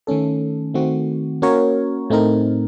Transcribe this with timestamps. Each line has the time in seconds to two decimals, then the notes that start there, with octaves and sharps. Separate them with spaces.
0.07 D#3 A3 C#4 A4
0.74 D#3 A3 C4 F#4
1.42 A#3 C#4 F#4 A#4 C#5
2.10 A2 A3 C4 D#4 A#4